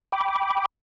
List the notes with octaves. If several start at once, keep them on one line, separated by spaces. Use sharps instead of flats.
G5 B5 D6